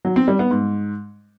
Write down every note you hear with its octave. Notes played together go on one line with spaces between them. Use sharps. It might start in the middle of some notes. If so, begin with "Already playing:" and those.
F#3
C4
G3
B3
G#2